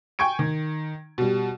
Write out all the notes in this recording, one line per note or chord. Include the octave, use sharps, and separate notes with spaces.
G5 G#5 C#6 G#6 D7
D#3
B2 G3